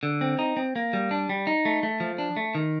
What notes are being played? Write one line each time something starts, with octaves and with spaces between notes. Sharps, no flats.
D3
C4
D#4
C4
A#3
G3
D4
G3
D#4
A3
A3
F3
D4
A3
D#3